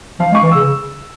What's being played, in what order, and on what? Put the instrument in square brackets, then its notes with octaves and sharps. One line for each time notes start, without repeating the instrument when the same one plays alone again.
[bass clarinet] F3 [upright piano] F5
[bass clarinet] G#3
[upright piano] C#6
[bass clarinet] E3
[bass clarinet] C#3 [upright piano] E6